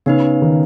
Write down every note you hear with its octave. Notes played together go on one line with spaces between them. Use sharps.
C#3 B3 D#4 B4
D#3